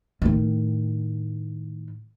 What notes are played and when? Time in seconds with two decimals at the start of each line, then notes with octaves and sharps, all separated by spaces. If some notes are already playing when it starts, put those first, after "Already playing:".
0.22 A2 D#3